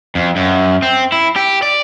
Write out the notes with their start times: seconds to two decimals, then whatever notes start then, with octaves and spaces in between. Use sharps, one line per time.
0.15 F2
0.36 F#2
0.82 C4
1.12 E4
1.36 G4
1.62 D5